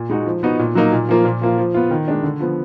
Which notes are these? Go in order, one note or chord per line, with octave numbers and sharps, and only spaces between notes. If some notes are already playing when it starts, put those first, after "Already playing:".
Already playing: A#2
G#3 D#4 F#4
F3
B3 D#4 F#4
A#2
F#3 A#3 D#4
A#2
F3 A#3 F4
A#2
F3 A#3 F4
F3
B3 F4
D#3
G#3 D4
D3
F3 B3